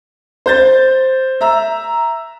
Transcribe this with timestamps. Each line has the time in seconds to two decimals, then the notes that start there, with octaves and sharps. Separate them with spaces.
0.46 C5 G6 A6
1.41 E5 A#5 E6